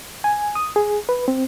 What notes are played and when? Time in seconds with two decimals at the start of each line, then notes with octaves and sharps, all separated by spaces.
0.24 G#5
0.55 D#6
0.76 G#4
1.09 B4
1.28 C4